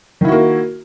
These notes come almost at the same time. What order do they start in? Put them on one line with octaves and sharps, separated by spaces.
D#3 E4 F#4 A#3